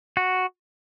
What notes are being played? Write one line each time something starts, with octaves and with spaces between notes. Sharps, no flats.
F#4